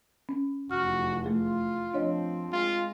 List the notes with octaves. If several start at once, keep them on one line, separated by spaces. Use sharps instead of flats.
C#4
F1 E2 F#4 F6
A3 F4 G#4
F3 C4 D4 C#5 D#5
G#3 F4